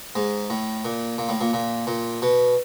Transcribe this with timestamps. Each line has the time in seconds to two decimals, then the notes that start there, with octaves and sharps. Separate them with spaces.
0.15 G#2
0.50 A2
0.85 A#2
1.18 A#2
1.29 A2
1.41 A#2
1.53 A#2
1.87 A#2
2.22 B2